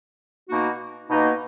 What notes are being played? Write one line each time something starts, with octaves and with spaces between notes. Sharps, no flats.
B2 A#3 D#4 F#4
B2 A#3 D#4